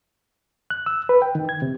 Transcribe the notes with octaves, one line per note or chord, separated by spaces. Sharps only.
F#6
E6
B4
G5
D#3
G#6
C3